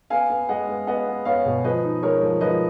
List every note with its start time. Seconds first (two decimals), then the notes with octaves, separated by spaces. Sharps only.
0.10 B3 F5 G#5
0.30 B3
0.49 G#3 D#5 F#5
0.68 B3
0.87 B3 D#5 F#5
1.07 B3
1.25 B3 C#5 F5
1.46 B2
1.64 F3 B4 D#5
1.84 D#4
2.02 G#3 A#4 C#5
2.22 F3
2.41 F3 B4 D#5